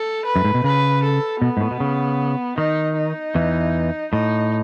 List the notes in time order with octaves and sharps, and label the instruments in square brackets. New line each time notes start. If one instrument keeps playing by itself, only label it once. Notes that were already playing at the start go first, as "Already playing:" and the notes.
Already playing: [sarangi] A4
B4
[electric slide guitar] F#2
G#2
B2
[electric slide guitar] C#3 [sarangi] B4
[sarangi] A4
[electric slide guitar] B2 [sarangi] B3
[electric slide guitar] G#2
A2
B2
C#3
[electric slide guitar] D#3 [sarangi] D#4
[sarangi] D#4
[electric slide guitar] E2 E3
[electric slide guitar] A2 [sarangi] D#4